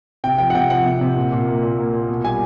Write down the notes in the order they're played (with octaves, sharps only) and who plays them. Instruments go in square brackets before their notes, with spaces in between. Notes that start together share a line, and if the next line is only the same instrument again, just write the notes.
[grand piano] C3 G5
F3 G5
F#5
C3 G5
F3 F#5
C3
C3
A#2
A#2
A#3
A#2
A#3
A#2
B2
G3 G#5